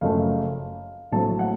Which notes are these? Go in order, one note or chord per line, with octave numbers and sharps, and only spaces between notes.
F#1 F#2 F3 A3 F5
A#1 A2 F#3 A3 C4 A5
F#5